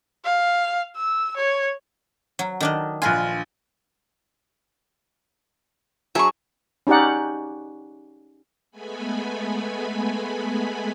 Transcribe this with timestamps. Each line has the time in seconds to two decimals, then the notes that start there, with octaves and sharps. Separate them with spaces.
0.25 F5
0.96 E6
1.36 C#5
2.39 F#3
2.60 D#3 D4 D#5
3.02 A#1 F4 B4 G#5
6.15 F#3 D4 G#4 E5 C#6
6.87 C#4 D#4 G4 D5 F#5
8.71 G#3 A3 B3 G#5 B5